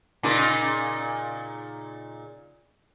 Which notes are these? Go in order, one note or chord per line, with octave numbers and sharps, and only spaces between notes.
A#2 C#3 D#4